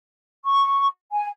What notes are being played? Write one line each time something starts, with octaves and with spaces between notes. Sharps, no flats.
C#6
G#5